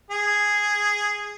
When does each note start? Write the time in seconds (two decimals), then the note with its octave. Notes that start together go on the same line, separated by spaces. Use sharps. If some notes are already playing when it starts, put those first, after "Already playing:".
0.11 G#4